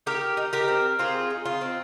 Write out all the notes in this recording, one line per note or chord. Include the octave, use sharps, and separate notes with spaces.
D#4 G4 A#4
D#4
G4 A#4
C4
C4 F4 G#4
D#4
F4
C4